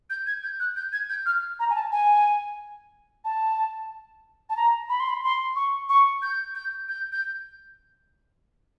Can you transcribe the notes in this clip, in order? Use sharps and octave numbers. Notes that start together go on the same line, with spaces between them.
G6
G#6
G6
F#6
G6
G#6
G6
F6
A#5
G#5
A5
G#5
A5
A5
A#5
B5
C6
B5
C6
C#6
C#6
G6
G6
G6
G6